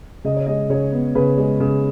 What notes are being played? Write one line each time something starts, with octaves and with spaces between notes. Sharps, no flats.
C#3 D#5
C#5
G#3 D#5
C#3 C#5
B3
C#3 B4
G#3
C#3